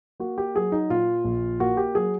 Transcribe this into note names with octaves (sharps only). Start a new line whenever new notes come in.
A#3 F#4
G4
F#3 G#4
D#4
A#2 F4
A#1
A#3 F#4
G4
F#3 G#4